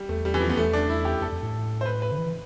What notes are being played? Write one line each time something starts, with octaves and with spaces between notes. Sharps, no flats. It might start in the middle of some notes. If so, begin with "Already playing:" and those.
Already playing: G3
E2 A3
G3
E3
F3
B3
E2 A3
D4
E4
G4
F2 A4
F2
A2
C5
B4
B4
D3
E3